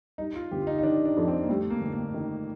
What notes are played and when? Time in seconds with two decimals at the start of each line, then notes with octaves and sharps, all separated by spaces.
0.18 G3 D#4
0.35 F4
0.51 G1 G4
0.62 F4
0.67 D#4
0.79 D#4
0.83 D#3 D4
1.05 D4
1.17 F2
1.28 C4
1.43 A#3
1.49 G3 A3
1.70 A#3
1.81 G1
1.92 A#3
2.14 D#3